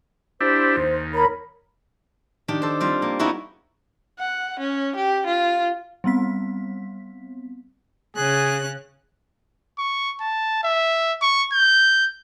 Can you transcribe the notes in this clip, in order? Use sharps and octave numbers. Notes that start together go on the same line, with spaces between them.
D4 E4 G4 C5
D#2
A#4 C#5 B5
D#3 D4 G4
A4 C5
G3 C4 F4
A#3
B3 C#4 D#4 E4 F#4 G#4
F#5
C#4
G4
F4
G3 B3 C4 B6
C#3 C#4 G#4 F#6
C#6
A5
E5
C#6
G6